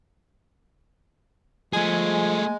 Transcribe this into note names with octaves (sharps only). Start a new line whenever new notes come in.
F3 G#3 A3 G#4 G#5